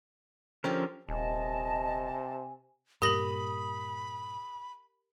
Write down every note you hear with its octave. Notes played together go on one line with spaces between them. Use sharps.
D3 F3 C#4 G4 A#4 C5
D#1 C3 D#5 G#5 A5
G2 A#2 G4 A#4 B5 D#6 A#6 F#7